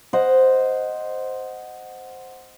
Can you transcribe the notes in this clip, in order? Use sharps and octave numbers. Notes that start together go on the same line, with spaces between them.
C5 D#5 F#5